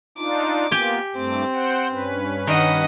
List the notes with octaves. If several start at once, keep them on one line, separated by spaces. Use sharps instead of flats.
D4 D#4 F4 D6
A#3 B3 F4 G4 G#5
G2 A3 C4 D6
C5 F#5 G5
G2 C#4 B4
D#3 D#5 F#5